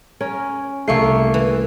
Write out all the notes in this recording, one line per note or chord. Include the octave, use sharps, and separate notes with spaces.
C#4 A#4
C2 A3 A#3 C#6 C7
E3